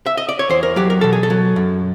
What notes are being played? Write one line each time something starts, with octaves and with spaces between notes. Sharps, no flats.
E5
D#5
D5
C#5
E2 C5
A#4
F#3 G4
A#4
B2 A4
G#4
A4
F#3
F#2